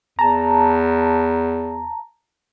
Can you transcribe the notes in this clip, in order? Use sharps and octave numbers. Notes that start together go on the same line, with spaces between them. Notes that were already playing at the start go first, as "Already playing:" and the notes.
E2 A5 A#5